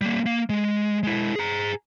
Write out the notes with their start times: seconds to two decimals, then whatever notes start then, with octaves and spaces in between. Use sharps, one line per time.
0.01 G3 A#3
0.26 A#3
0.50 G#3
1.03 G#3 E4
1.36 G#4 A#5